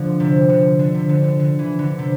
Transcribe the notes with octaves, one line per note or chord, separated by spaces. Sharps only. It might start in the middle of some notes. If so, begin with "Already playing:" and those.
Already playing: D3 F3
C3
D3
D3
C3
D3
D3
D3
E3
D3
C3